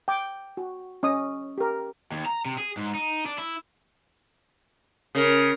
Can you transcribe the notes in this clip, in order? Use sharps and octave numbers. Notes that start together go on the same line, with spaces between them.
G5 D6
F#4
C#4 D#5 D#6
G4 A#4
D#2
A#5
C3
G#4
G#2
D#4
D4
E4
C#3 A#4